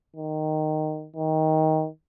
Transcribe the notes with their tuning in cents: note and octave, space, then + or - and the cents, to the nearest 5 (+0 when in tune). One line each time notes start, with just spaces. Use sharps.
D#3 -10
D#3 +15